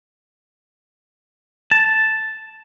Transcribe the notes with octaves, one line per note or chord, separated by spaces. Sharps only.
A5